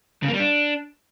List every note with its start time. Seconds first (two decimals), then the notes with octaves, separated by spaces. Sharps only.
0.23 C#3
0.28 A#3
0.34 G3
0.40 D4